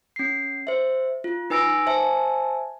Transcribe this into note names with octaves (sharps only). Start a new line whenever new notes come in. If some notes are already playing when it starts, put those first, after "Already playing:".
C#4 C7
C5 E5
F4
D#4 B4 G#5 E6 A#6 D7
C5 E5 G#5 A5